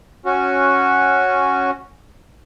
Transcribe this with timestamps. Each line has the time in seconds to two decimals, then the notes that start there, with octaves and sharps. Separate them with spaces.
0.26 C#4 F#4